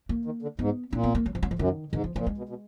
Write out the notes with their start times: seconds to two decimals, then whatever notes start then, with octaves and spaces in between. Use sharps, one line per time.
0.09 A#3
0.25 D#3
0.42 D3
0.59 G#2 B3
0.93 A#2 D4
1.03 B3
1.15 A#3
1.26 F#3
1.35 F3
1.43 F#3
1.51 F3
1.59 F#2 D#3
1.92 G#2 D#3
2.04 F3
2.16 A#2 F3
2.26 G#2 G#3
2.38 B2
2.49 B2